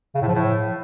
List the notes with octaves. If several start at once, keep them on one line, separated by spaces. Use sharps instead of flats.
C#3
A2
F3
A2